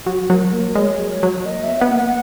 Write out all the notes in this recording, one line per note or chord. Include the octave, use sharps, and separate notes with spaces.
F#3 F#4
F#3 A#4
A#3 A#4
G#3 C#5
F#3
C#5
F#3
A#3 D#5
B3 E5
B3 F#5
A#3
F#5